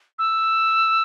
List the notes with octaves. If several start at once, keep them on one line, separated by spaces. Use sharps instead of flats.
E6